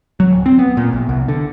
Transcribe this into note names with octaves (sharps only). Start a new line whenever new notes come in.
F#3
D1
C4
B3
A#2
A#1
C2
D3